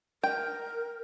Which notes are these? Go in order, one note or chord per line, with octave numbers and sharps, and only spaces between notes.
A#4 G5